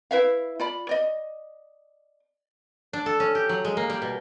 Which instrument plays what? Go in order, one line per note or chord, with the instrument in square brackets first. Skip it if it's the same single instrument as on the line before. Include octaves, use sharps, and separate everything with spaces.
[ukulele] E4 B4 E5 F5
F4 D5 B5
D5 D#5
[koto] D4
A4
C#4
G4
F#3
G#3
A#3
G3
B2